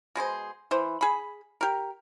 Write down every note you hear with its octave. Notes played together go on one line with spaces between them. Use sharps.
B2 G#3 G#4 C5
E3 C5
G#4 B5
G4 A#4